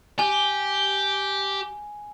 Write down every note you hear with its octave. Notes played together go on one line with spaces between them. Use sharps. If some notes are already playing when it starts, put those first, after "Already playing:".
G4 G#5